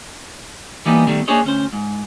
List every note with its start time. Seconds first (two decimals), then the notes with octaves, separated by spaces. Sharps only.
0.86 E3 G3 A#3 B3 D#4
1.07 B2 D#3 G3 A3
1.28 A#3 D4 G#4 C5 C#5 D#5
1.44 D2 C#4 C5
1.73 G#2